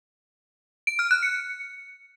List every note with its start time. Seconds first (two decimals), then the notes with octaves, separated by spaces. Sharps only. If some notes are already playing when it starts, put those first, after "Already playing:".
0.87 D7
0.99 F6
1.11 F#6
1.23 C#7